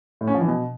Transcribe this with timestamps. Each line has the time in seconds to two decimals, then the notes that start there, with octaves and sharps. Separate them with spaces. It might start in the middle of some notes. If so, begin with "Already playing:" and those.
0.21 A2
0.28 C#4
0.34 F3
0.41 E3
0.48 B2